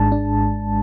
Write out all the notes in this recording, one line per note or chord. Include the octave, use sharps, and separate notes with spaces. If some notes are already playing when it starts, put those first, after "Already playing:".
Already playing: G#1 G#2 G#3 D4 A5
D4